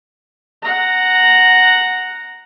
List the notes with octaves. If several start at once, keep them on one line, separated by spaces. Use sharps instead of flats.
F#5 A#5